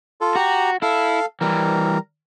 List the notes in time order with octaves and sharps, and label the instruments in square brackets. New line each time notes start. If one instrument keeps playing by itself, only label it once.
[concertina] F4 A4
[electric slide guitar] F#4 [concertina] G4 A#5
[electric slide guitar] E4 [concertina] A4 F5
[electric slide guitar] E3 G3 [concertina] A#4